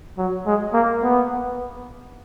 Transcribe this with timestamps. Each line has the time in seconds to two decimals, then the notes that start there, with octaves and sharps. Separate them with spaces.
0.18 F#3
0.46 G#3
0.73 A#3
1.03 B3